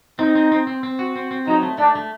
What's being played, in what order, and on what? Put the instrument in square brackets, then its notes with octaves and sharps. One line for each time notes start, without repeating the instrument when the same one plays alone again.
[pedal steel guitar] C4 [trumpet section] D#4
[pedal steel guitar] C4
C4
C4
C4
F#4
C4
C4
[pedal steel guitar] F#3 [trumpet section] D#4
[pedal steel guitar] A3
[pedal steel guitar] A3 [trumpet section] D4
[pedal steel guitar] A3